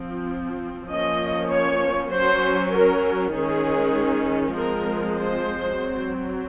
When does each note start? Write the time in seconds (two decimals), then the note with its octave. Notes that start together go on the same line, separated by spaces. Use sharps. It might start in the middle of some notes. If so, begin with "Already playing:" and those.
Already playing: F3 C4
0.91 F3 A#3 C#4 D#5
1.51 C#5
2.11 F#3 C5
2.17 C#4
2.73 A#4
3.33 D#3 G#3 C#4 G#4
4.54 F3 G#3 C4 A#4
5.16 C5
5.76 F#3 C4